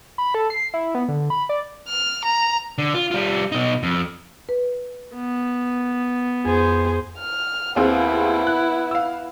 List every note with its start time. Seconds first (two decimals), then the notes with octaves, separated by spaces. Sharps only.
0.18 B5
0.35 A4
0.50 C7
0.74 E4
0.95 B3
1.08 D3
1.30 B5
1.49 D5
1.86 F6
2.23 A#5
2.78 D3
2.94 F4
3.11 G3 F4
3.52 B2 D#4
3.83 F2
4.49 B4
5.14 B3
6.45 F2 G#4 C5
7.18 F6
7.76 D#2 B3 C4 E4 G#4
8.47 F#6
8.91 F5 E6